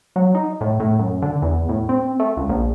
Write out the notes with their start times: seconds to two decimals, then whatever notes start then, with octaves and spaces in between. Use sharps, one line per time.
0.16 F#3
0.35 D#4
0.61 A2
0.80 A2
0.99 F#2
1.22 D3
1.42 E2
1.69 A2
1.89 C4
2.20 A3
2.37 C#2
2.49 A#1